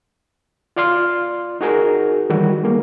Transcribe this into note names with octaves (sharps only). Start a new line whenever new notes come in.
F4 D5 F5 C6 F6
D#4 F#4 G#4 A#4
D#3 E3 G3 F#4
G#3 A#3